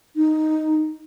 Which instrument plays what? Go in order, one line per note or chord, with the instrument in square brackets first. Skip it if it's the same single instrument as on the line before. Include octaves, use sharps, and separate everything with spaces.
[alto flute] D#4